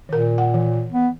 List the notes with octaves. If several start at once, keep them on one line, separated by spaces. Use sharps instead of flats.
A#2 D#3 A#4
F#5
E3
B3